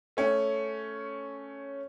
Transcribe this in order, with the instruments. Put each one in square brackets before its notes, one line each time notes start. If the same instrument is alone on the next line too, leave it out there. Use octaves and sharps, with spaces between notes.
[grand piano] A3 C#4